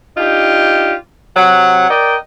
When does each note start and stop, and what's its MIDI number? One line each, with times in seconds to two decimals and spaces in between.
0.17 0.94 62
0.17 0.94 63
0.17 0.94 65
0.17 0.94 67
1.36 1.87 48
1.36 1.87 54
1.36 1.87 78
1.90 2.15 70
1.90 2.15 74
1.90 2.15 75
1.90 2.15 79